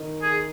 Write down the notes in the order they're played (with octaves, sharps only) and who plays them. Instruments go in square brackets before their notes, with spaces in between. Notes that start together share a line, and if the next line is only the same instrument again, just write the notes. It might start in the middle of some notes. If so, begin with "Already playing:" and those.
Already playing: [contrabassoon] D#3
[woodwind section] G#4